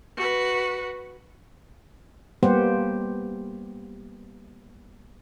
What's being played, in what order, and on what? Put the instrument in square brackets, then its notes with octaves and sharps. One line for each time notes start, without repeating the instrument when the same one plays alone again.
[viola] F#4 B4
[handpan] G3 A#3 B3 G4 C5 F#5